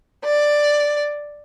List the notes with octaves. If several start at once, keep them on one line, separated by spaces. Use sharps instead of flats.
D5